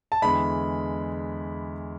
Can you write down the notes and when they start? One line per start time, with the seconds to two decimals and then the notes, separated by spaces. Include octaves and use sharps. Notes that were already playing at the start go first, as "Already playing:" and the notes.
0.12 A5
0.22 E2 D3 G#3 B5